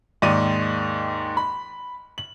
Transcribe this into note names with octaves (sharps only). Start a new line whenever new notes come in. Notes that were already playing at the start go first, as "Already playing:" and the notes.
D#2 G#2 D#3 D5 D#5 D#7
B5
F#7